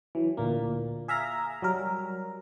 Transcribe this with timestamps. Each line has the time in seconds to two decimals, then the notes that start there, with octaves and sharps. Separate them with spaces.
0.15 E3 F#3
0.37 D2 A#2 A#3
1.08 G#4 E5 F5 A#5
1.62 F#3 G3 A#4